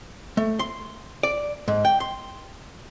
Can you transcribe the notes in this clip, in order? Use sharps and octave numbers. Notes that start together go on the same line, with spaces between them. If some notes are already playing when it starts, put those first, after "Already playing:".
A3
C6
D5
G#2
G5
C6